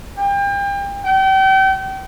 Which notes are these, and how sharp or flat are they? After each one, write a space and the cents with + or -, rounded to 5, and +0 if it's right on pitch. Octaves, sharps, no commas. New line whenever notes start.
G5 +35
G5 -35